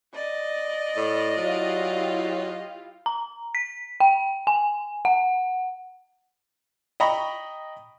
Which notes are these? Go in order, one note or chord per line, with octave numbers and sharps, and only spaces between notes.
D5 D#5
A2
F#3 E4 F4 G4
A#5
B6
G5
G#5
F#5
D#5 G5 A#5 B5 C#6